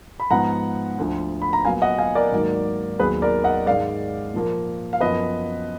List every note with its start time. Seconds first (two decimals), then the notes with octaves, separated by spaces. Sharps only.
0.20 B5
0.30 G#2 F3 B3 F#5 A#5
0.98 D2 D3 F3
1.42 B5
1.53 A#5
1.65 A#2 F#3 B3 F5 G#5
1.82 D#5 F#5
1.98 F5 G#5
2.15 A#4 D5
2.32 G#2 D#3 F#3 A#3
2.99 D#2 D#3 F#3 B3 G#4 B4
3.22 A#4 D5
3.44 D#5 F#5
3.66 G#2 D#3 G#3 D5 F5
4.34 A#2 F3 A#3
4.93 F5
5.00 F#2 F3 B3 B4 D#5